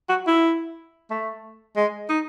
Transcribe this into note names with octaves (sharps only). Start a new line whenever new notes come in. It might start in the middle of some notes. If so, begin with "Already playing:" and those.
F#4
E4
A3
G#3
D#4